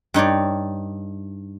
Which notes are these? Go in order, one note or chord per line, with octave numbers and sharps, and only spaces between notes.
G2 D#4 C#5 D5